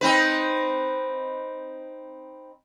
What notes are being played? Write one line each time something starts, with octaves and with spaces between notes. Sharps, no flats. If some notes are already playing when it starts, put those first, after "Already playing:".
C4 D#4 B4